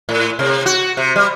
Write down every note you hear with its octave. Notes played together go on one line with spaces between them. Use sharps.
A2
C3
F#4
C3
G3